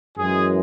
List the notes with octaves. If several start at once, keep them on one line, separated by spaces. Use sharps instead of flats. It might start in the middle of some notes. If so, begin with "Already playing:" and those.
F#2 E3 G#3 G#4